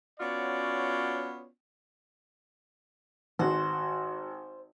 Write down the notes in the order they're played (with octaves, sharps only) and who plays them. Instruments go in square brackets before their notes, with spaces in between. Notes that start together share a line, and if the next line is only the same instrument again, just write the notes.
[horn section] B3 C#4 F4 F#4 C#5 D5
[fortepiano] G#1 F#4 [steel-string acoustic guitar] C5